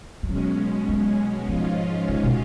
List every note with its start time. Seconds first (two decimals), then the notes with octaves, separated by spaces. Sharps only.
0.23 F3
0.29 B2 F#3 G#3 C#4
0.89 F#3
1.49 G#2 F3 G#3 C#4 F4
2.09 C#3
2.24 B2